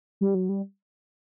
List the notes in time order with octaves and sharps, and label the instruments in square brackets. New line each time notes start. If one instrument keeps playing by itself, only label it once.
[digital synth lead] G3
F#3
G3